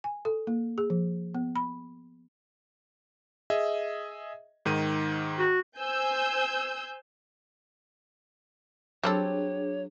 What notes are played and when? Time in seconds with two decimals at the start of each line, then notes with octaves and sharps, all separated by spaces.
0.04 G#5
0.25 A4
0.47 A#3
0.78 G#4
0.90 F3
1.35 B3
1.56 B5
3.50 G#4 D#5 E5
4.65 G#2 D#3 D#7
5.39 F#4
5.79 C5 G#5 E6 G6
9.04 F#3 G3 C4 D4 G#4 A4 C#5